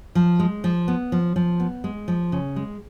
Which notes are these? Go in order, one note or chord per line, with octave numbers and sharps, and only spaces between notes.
F3
G#3
F3
B3
F3
F3
B3
G#3
F3
C#3
G#3